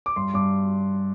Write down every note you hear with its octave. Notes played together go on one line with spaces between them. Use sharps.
D6
G2 C6
G2 D6